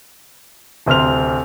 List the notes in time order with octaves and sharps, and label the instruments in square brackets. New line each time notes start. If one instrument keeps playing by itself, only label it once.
[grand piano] D1 C3 C5 F6 F7